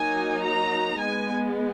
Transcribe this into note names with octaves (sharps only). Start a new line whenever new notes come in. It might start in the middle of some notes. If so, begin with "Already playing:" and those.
Already playing: F#3 A#3 D#4 G#5
A#5
G#3 B3 G#5